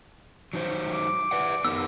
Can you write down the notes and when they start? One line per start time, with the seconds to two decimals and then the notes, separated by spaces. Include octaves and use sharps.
0.53 F#3 D#4 C5
0.93 D6
1.31 B4 D5 F#5
1.65 B3 D#4 A#4 E6